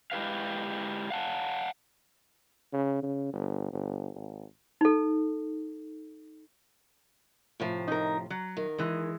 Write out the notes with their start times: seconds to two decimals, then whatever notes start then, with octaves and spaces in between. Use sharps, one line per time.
0.12 G#3 E4 G4 B4 F5
1.10 F5 F#5 A5
2.73 C#3
3.02 C#3
3.33 G1
3.73 G1
4.15 G#1
4.81 D#4 A4
7.60 A2 C3 F3
7.88 D#4 A#4
8.30 F#3
8.57 D#3
8.78 E3 G#3